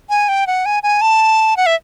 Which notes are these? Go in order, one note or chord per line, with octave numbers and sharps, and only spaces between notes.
G#5
G5
F#5
G#5
G#5
A5
F#5
E5